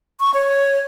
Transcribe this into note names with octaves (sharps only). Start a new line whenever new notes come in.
C#6
C#5